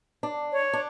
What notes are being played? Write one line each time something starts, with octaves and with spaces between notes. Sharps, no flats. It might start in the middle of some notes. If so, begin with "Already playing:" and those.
D4
C#5
D4